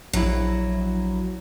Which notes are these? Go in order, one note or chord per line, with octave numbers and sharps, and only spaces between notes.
A#1 F#3 E4